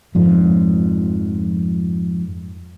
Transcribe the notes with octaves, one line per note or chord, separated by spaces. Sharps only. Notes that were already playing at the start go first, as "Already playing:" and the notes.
F2 G#2 F3